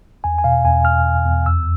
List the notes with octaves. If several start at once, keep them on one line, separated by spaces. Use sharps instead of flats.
E2 G#5
G#5
B2 F5
E2 G#5
E2 F6
E2
E2
F2 E6